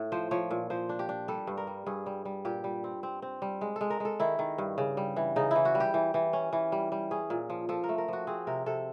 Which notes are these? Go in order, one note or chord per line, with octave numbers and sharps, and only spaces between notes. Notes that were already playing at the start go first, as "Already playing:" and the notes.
Already playing: A2
F3 C5
F3 C#5
A#2
F3 C5
D4
G4
D4
G3 A4
G2
A#4
G3
G2 G#4
G3
G3
A#2 G4
G3
C4
C4
C4
G3
G#3
G#3 A4
A#4
G#3 A4
D#3 E4
D#3
G2
C#3
G3
E3
C#3 D#4
E3 E4
F#4
G3
G4
E3
E3
C#4
E3
G3
G3
C#4 G#4
A#2
F3
F3 A4
A#4
A3
A#4
F3 F#4
C4 G#4
C3 A#4
C3 A4